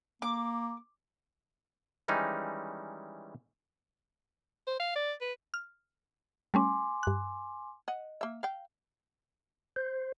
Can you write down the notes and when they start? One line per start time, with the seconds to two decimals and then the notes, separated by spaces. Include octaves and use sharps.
0.22 A#3 D6
2.08 D#3 E3 G3 G#3 C#4 D#4
4.67 C5
4.79 F5
4.96 D5
5.21 B4
5.54 F6
6.54 G3 A3 C#4 G#5 C6 D6
7.03 G2 F#6
7.88 D#5 F#5
8.21 A#3 E5
8.43 F5 G5
9.76 C5